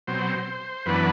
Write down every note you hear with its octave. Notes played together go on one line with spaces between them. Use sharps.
B2 F#3 C4 C5
F#2 E3 B3 D4 B4